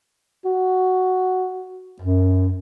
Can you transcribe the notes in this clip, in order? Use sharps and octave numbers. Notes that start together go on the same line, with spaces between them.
F#4
F#2